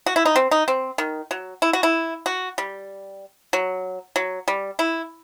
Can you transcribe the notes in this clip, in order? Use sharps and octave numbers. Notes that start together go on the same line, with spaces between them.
F#4
E4
D#4
C4
D#4
C4
D#3
F#3
E4
F#4
E4
F#4
G3
F#3
F#3
G3
E4